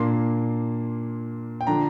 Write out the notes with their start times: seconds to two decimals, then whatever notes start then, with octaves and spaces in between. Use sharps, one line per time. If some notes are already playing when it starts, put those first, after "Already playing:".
Already playing: A#2 A#3 D4 C6
1.61 G5
1.67 D3 F3 D4 A#5